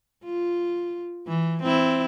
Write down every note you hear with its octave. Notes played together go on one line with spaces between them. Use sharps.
F4
E3
C4 E4